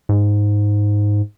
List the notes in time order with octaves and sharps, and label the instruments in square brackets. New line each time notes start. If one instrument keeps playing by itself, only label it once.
[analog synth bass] G#2